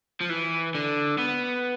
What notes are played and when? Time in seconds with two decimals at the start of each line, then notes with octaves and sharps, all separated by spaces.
0.21 F3
0.30 E3
0.75 D3
1.18 B3